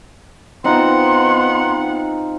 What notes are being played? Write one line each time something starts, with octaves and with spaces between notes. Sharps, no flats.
B3 C4 D#4 F4 F#5 C6